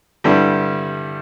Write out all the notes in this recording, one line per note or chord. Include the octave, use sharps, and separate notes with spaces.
G2 D3 G3 E4 G4